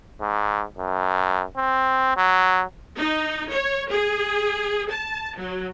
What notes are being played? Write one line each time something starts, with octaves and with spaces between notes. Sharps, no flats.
G#2
F#2
C4
F#3
D#4
C#5
G#4
A5
F#3